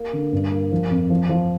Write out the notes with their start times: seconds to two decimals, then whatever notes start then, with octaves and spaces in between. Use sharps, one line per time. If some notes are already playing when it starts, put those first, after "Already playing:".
Already playing: A#3
0.13 D3
0.33 G2
0.51 A#3
0.72 F3
0.90 F2
1.10 F3
1.29 F3